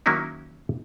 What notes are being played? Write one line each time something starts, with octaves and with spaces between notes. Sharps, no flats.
D#3 F#3 A#3 C#4 D#4 E4